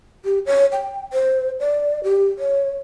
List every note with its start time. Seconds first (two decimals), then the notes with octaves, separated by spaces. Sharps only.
0.25 G4
0.46 C#5
0.72 G5
1.13 C5
1.60 D5
2.04 G4
2.39 C#5